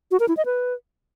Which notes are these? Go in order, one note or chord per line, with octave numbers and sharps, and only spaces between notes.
F#4
A#4
E4
D#5
B4